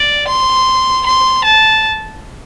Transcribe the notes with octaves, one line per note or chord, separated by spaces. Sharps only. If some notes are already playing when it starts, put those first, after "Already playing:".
Already playing: D5
C6
C6
A5